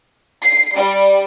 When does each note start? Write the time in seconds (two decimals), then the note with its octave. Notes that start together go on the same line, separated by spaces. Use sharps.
0.44 C7
0.78 G3